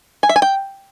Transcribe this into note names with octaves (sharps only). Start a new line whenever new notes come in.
G#5
E5
G#5
G5